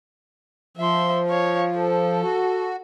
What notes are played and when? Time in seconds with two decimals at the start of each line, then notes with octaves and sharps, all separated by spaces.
0.77 F3 E5 C6
1.27 C#5 F5
1.77 A4
2.22 F#4